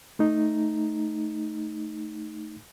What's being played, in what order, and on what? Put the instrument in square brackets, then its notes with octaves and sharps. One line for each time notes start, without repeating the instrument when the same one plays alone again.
[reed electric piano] A3 D#4